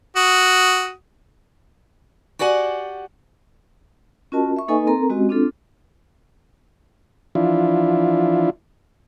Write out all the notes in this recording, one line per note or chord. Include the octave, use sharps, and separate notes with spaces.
F#4 D#6
F#4 G4 D5 F#5 G#5
C#4 F4 F#4 A#4 D#5 A5
E5 C#6
A#3 D#4 A4 B4 D#5 G#5
C4 A4 A#4 A#5
G#3 C4 C#4 F#4 G4 D#5
C4 D4 F4 A4
E3 F3 D4 E4 F4